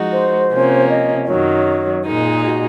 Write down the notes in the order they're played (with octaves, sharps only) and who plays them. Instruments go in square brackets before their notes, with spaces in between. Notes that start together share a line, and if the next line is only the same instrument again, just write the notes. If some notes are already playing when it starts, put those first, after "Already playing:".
Already playing: [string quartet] F3 G#3 D#4 F#4
[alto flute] C5
[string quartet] C3 F3 A#3 C#4
[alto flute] D#5
D#5
[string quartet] F#2 D#3 F#3 [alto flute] C#5
[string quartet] A#2 G#3 D#4 [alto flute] A#4
[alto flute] G#4
F#4